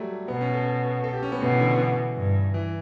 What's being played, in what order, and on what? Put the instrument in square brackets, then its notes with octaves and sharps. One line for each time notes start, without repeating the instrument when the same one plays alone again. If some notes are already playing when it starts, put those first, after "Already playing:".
Already playing: [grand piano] F#3 G3 A3
[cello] B2 [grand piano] B3
[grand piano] C#4
A4
A4
G4
C#4
B3
[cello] B2 [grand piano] A3
[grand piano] E3
D3
E3
[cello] G2
[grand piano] E3